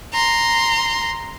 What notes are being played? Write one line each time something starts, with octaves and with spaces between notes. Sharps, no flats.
A#5 C6